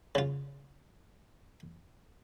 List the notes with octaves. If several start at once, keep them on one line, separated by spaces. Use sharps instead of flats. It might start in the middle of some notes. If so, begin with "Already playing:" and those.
C#3 F4